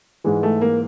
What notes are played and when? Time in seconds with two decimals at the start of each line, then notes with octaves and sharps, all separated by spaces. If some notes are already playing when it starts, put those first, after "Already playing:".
0.24 G#2 E3 G#3
0.43 A3
0.61 A#3